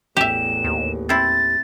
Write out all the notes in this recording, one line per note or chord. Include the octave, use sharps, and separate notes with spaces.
A1 E2 G4 E5 E7
D#2
C4 E4 A6